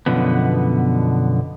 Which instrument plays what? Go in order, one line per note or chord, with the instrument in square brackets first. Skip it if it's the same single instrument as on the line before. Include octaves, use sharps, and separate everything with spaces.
[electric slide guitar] F#2 B2 D3 F3 B3